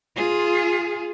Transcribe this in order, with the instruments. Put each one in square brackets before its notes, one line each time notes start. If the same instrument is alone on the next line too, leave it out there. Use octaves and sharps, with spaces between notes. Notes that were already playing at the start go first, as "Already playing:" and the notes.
[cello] F4 G#4